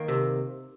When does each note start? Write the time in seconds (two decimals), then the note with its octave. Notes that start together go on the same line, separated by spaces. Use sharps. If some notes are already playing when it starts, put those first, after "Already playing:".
Already playing: D#3 A#3
0.08 C3